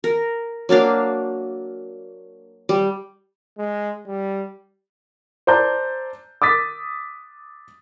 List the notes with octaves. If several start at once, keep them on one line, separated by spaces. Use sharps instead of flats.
A#4
F#3 A#3 D4 F5
G3
G#3
G3
C5 D5 A5 A#5 G6
D6 D#6 A6 B6